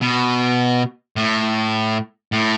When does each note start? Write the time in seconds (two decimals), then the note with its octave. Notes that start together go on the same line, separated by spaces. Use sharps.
0.02 B2
1.16 A2
2.32 A2